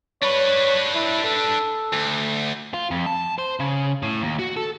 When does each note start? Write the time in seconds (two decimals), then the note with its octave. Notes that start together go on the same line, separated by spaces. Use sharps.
0.22 D4 B4 C#5
0.95 E4
1.24 A4
1.93 D2
2.74 F4
2.91 F2
3.06 A5
3.38 C5
3.60 C#3
4.03 A2
4.22 D#2
4.39 F#4
4.56 A4